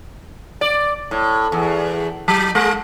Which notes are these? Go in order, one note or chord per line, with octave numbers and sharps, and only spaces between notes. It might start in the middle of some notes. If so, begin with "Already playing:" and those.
D5
A2
E2
F#3
G#3